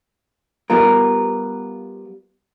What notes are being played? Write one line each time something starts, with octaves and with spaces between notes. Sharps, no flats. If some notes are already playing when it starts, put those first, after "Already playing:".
G3 B3 F4 A#4